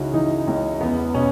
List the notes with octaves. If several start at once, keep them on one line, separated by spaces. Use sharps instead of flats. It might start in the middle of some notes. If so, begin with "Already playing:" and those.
Already playing: C#2 C#3 C#4 D#4 E4 F#4
E3 D#4
C#2 C#4
E2 B3
B2 C#4